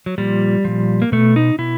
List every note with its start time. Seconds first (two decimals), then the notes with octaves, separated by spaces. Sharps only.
0.06 F#3
0.18 A#2 F3 G3
0.65 A#2 F3
1.02 A#3
1.12 B2 A3
1.36 D#4
1.58 B2 E4